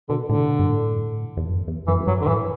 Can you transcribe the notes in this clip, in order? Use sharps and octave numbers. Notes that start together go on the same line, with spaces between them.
B2 D3
A2 D3
C3
B2
G2
A2
E2
F#2
E2
F#2 E3
F#2
G2 F#3
D3
A2 E3